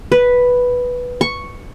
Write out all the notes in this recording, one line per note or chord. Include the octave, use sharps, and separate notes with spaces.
B4
C#6